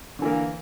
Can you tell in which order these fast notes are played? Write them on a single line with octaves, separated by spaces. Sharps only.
D3 E3 A#3